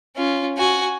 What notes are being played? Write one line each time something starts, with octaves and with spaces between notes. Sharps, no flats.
C#4 F4
F#4 G#5